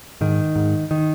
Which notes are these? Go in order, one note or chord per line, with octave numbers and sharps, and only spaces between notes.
G#2 D#3
G#2
D#3